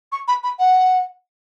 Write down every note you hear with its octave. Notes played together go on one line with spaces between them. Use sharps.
C#6
B5
B5
F#5